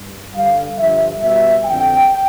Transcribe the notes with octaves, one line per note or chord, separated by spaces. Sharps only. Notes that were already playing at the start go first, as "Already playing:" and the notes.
Already playing: G2
G2 D3 G3 F5
G2 D3 F3 E5
B2 G3 E5
F2 D3 F3 G5